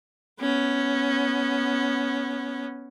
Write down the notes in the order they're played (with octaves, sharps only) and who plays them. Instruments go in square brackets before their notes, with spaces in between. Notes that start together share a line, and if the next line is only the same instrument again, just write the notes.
[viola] B3 C#4